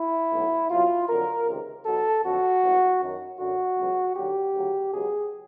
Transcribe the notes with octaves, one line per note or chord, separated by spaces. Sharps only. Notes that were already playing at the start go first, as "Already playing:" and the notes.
Already playing: E4
B1 A2 F#3
C2 B2 F#3 F4
F2 D3 F#3 A#4
C#2 C3 D#3
B1 B2 F#3 A4
F2 D3 F#3 F#4
A1 G#2 E3
F#2 D#3 F#3
F#2 D3 F#3 F#4
C#2 B2 F#3
D#2 D3 F#3 G4
D2 C#3 F#3
C#2 B2 F#3 G#4